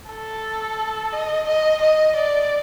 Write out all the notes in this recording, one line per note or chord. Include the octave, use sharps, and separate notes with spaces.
A4
D#5
D#5
D#5
D5